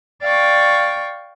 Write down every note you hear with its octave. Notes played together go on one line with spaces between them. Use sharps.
D5 F5 G5 C#6